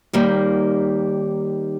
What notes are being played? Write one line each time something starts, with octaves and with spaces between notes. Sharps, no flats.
D#2 D#3 G3 A#3